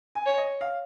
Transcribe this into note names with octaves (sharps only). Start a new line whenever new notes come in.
G#5
C#5
D#5
F5